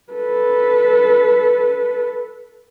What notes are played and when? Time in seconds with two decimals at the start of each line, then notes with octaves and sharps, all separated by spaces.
0.13 A4 B4